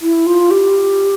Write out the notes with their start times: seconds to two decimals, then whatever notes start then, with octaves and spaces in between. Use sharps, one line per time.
0.02 E4
0.26 F4
0.51 G4